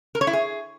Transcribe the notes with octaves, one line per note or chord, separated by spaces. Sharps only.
A#4
C#5
E4
G#4